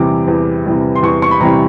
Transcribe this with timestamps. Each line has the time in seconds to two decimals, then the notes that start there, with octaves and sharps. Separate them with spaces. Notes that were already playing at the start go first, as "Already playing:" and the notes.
Already playing: E2 C3 E3 G3 D6
0.27 E2
0.66 C3 E3 G3
0.95 C6
1.03 E2 C#6
1.22 C#6
1.31 B5
1.41 C3 E3 G3 A#5